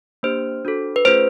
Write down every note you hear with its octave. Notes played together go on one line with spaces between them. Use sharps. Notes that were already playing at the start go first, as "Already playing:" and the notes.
A#3 D4 G4 C5
D4 F#4 A4
B4
A3 C#4 F4 G#4 C5